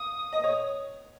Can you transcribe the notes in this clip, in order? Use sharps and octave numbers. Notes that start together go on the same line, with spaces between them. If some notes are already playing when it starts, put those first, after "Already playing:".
Already playing: F5 D#6
D#5
C#5